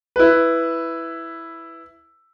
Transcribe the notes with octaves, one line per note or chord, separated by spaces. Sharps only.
E4 B4